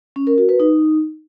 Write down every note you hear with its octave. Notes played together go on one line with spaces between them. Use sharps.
C#4
A#4
F#4
B4
D#4